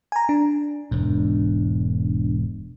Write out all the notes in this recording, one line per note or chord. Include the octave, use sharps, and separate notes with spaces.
G#5 A#5
D4
E1 G#2